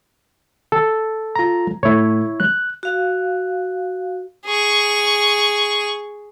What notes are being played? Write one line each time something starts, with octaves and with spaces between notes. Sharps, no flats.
A4
F4 A#5
A2 A3 E4 C#5
F#6
F#4 F5
G#4 C#6